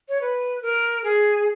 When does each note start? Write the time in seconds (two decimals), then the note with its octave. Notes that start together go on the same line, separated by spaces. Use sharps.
0.09 C#5
0.21 B4
0.62 A#4
1.04 G#4